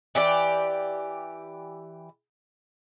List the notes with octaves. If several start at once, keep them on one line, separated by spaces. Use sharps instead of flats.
E3 G4 D5